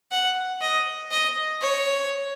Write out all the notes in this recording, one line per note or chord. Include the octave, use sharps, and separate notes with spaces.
F#5
D#5
D#5
C#5